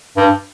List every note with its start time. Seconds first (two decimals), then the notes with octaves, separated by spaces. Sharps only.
0.17 G2